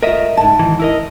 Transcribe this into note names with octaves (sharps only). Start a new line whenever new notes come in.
A3 F4 A#4 D#5 E5
G#2 C#3 A5
D#3 E3
E4 A#4 D#5